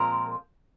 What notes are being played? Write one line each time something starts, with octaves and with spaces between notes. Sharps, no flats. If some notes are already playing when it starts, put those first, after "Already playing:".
Already playing: A#2 F3 G#3 C4 A#4